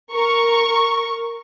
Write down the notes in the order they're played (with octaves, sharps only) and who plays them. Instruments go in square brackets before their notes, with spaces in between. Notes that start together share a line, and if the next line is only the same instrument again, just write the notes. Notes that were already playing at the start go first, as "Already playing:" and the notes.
[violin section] A#4 C#6